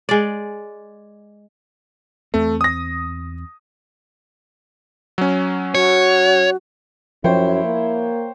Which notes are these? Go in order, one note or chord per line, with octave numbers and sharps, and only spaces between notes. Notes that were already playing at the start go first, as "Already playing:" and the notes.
G#3 D5
E2 A3 C4
D#6 A#6
F#3 C#4
F#4 C#5
F#2 F3 E4 C5 C#5 G5
A#3